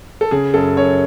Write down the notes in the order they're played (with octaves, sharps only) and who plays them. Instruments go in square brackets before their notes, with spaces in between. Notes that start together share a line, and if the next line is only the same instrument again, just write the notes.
[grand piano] A4
C#3 G#4
F#2 A4
F#2 C#5